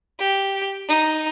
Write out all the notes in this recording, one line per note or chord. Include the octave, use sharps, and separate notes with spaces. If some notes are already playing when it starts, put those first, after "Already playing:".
G4
D#4